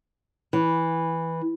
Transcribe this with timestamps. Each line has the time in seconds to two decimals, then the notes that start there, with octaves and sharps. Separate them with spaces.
0.53 E3